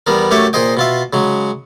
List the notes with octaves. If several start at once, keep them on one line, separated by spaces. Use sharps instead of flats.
E2 G3 B3 A#4
F#2 A3 G4 C#5 E5 A5
A#2 G#4 C5 D#5 G5
B2 F4 E5
C#3 F#3 G#3